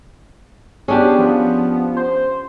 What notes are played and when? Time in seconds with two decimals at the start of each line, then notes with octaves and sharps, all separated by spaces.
0.88 B3 C#4 D4 G4 G#4
1.18 F3
1.97 C5